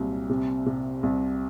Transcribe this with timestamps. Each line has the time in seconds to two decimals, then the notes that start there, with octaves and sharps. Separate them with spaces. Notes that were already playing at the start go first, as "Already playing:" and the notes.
Already playing: C2 A#2 F#3
0.29 C3
0.66 C3
1.03 C2